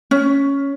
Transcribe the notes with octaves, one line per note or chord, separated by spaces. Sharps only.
C#4